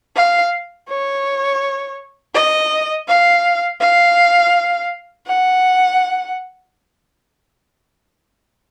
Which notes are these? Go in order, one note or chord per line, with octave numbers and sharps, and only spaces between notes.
F5
C#5
D#5
F5
F5
F#5